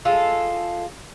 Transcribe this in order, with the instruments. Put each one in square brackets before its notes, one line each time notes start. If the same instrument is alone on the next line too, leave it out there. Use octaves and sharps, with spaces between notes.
[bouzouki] G#3 F4 A4